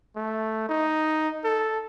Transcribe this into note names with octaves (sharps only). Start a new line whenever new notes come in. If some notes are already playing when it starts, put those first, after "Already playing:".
A3
D#4
A4